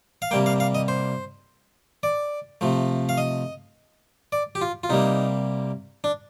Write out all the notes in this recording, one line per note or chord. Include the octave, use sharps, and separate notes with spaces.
F5
C3 G3 A#3 G5
F5
F5
D#5
C5
D5
C3 F3 A3
F5
D#5
D5
G4
F4
F4
C3 G3 A#3 D#4
D4